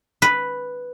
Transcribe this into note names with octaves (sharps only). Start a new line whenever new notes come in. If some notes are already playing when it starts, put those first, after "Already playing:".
B4